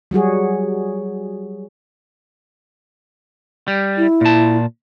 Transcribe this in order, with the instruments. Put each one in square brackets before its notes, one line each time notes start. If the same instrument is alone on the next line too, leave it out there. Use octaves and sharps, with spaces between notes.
[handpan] F#3 G3 F#4 G#4
[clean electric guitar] G3
[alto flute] E4
[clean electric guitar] A#2 A5